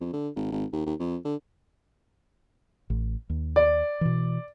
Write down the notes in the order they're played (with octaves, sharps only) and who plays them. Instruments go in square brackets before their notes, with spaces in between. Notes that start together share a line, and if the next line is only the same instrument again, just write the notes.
[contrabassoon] F2
D3
G#1
G#1
D#2
D#2
F2
D3
[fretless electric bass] A1
D#2
[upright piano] D5
[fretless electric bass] B2 E3